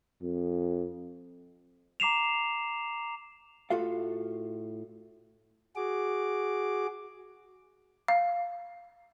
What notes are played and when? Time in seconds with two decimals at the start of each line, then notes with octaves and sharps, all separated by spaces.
0.22 F2
2.00 A#5 D6 C7 E7 F7
3.70 A2 F4 F#4 A4 F5
5.76 F#4 G#4 D6
8.08 F5